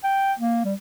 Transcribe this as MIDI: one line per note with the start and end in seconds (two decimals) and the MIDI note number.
0.04 0.33 79
0.39 0.60 58
0.65 0.74 55